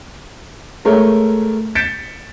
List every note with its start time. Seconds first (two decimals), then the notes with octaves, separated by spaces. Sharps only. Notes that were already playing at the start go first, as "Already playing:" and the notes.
0.85 G#3 A3 A#4 C#5
1.75 G6 A6 B6 C#7 D7 E7